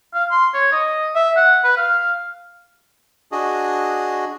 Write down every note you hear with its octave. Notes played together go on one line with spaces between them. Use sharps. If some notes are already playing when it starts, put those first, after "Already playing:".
F5
C6
C#5
D#5
E5
F#5
B4
F5
D4 F#4 G#4 D#5